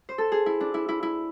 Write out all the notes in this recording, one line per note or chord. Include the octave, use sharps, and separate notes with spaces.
C5
A4
G#4
E4
D4
E4
E4
E4